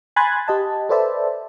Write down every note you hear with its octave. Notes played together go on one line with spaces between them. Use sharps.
G#5 B5 C6 F#6 G#6 A6
G4 D#5 A5
A4 B4 C5 D5 E5 A5